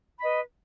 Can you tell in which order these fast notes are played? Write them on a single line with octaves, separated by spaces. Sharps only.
B5 D#5 B4